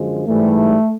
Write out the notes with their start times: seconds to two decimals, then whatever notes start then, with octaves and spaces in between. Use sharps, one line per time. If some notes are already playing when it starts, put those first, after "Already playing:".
Already playing: F#2 D3 F3 G#3
0.28 G#2 E3 G3 A3